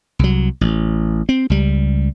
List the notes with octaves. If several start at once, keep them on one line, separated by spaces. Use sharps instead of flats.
C2 F#3
A1
C4
C#2 G3